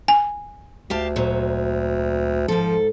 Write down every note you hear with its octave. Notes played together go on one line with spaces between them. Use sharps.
G#5
D2 G4 F5 A5
F2 A#2 F#3
G#2 F3 A4